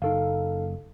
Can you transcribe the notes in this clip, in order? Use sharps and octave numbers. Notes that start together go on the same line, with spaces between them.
F#1 D#4 A4 F5